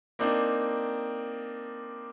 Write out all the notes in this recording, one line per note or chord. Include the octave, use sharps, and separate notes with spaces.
A#3 C4 D4 D#4